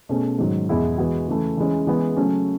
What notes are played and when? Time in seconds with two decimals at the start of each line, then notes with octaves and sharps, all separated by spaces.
0.09 B2 A3 C#4 G#4
0.38 G#2 D#3 F#3
0.69 E2 B2 G#3 B3 E4
0.98 E3 G#3 B3 F#4
1.28 C#3 E3 A3
1.57 E3 G#3 C#4
1.87 E3 G#3 B3
2.17 C#3 F#3 A3 C#4